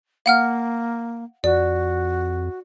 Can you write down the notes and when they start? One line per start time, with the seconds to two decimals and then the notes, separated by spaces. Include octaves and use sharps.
0.26 A#3 F5 F#5 F6
1.44 F2 F#4 D5